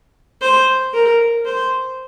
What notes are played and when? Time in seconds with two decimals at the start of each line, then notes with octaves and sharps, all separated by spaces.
0.42 C5
0.94 A#4
1.46 C5